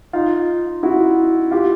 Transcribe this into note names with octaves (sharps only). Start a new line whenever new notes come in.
D#4 F4
E4 F#4
F4 G4